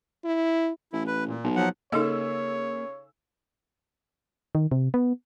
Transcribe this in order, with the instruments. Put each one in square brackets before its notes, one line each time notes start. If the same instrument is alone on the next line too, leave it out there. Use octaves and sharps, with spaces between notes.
[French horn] E4
[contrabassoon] A1 [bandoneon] E4
[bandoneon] B4
A#2
[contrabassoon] B1
[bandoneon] F3 F#3 F#5
[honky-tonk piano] C#3 E6 [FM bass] A#3 [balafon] D#4 A4 D#5 [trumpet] C#5
[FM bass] D#3
C3
B3